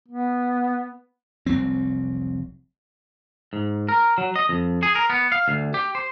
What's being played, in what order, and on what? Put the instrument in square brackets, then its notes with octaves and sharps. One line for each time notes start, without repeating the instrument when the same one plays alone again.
[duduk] B3
[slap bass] F1 C2 F#3 C4
[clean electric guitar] G#2
A#4
F#3
D#5
F2
G#4
A#4
B3
F5
D2
G4
C5